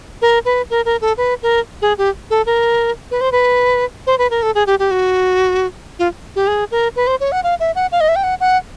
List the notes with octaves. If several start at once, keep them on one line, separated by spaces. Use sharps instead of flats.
A#4
B4
A#4
A#4
A4
B4
A#4
G#4
G4
A4
A#4
B4
C5
B4
C5
B4
A#4
A4
G#4
G4
G4
F#4
F4
G4
G#4
A#4
B4
C5
C#5
F#5
F5
E5
F#5
F5
D#5
E5
G5
F#5
F#5